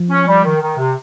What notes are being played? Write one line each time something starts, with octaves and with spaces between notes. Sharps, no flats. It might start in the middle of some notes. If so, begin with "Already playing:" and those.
Already playing: F3
C#4
G3
D#3
D#3
C3